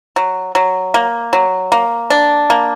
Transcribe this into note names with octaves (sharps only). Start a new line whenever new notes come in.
F#3
F#3
A#3
F#3
A#3
D4
A#3